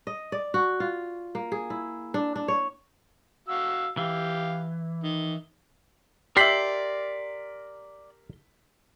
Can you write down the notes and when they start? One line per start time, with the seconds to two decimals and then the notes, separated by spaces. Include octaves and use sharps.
0.07 D#5
0.32 D5
0.54 F#4
0.80 F4
1.35 A#3
1.52 G#4
1.70 E4
2.14 D4
2.36 D4
2.48 C#5
3.48 F#4 F5 E6
3.97 E3 G4 F5
5.03 D#3
6.37 G4 A#4 D5 E5 C6 B6 F#7